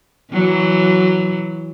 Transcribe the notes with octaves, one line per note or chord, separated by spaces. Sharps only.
E3 F#3